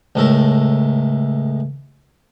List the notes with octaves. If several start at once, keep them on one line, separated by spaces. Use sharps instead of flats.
C#2 A2 A4 A#4